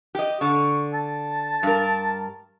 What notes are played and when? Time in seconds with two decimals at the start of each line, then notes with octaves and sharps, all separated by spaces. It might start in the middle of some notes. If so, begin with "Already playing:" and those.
0.15 G4 D#5
0.41 D3 C#6
0.93 A5
1.63 G2 A#4